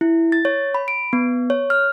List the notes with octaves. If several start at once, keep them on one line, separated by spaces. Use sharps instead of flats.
E4
A6
C#5
B5
D7
B3
C#5
F6